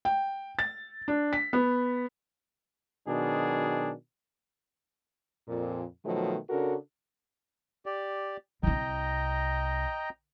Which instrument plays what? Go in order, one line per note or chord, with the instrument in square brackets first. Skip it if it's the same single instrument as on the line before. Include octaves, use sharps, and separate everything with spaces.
[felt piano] G5
A6
D4
B6
B3
[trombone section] B2 D#3 F#3 D4 G#4
[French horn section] F2 A#2
B2 D#3 F3 F#3 A3
C#3 D4 F#4 A4 A#4
[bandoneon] G4 D5
[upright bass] C2 C3 [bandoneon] D#5 G5 A#5